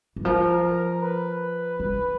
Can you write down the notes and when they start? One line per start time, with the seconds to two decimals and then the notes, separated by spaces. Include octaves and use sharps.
0.16 E3
0.25 F3 A#4
0.65 A#4
1.03 B4
1.80 D#3